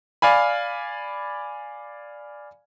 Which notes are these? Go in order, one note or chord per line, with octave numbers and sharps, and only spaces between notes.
D5 F5 G#5 B5